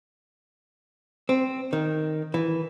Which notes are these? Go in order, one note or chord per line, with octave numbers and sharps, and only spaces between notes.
C4
D#3
E3